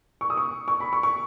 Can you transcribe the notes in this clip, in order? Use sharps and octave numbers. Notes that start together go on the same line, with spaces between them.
C#6
D#6
C#6
C#6
B5
C#6
C#6